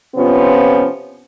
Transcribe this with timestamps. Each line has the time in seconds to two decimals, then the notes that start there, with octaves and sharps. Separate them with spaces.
0.16 C3 F3 B3 C#4 F4